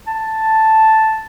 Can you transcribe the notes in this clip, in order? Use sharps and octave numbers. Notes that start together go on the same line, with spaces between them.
A5